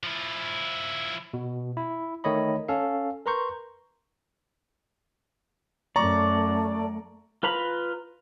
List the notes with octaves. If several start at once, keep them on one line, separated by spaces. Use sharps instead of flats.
F3 E4
B2
E4
D#3 A3 C#5 D#5 B5
C#4 A4 F5
A#4 B4 A#5 C6 C#6 G6
F#2 A3 D5 A#5 C#6
F4 B4 A#5 B5